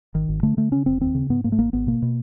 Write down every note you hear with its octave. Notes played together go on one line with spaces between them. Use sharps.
G#1 D#3
G#1
D3 A3
D3 A3
C#3 C#4
F1 C4
D#2 C4
C#3
G#2 B3
G#2 A#3
A3
G#1 A#3
G#1 B3
B2 A#3
B2